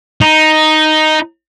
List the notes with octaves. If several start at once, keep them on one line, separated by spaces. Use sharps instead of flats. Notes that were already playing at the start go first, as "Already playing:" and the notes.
D#4